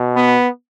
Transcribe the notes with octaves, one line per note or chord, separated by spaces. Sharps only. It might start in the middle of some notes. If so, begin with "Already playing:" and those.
Already playing: B2
B3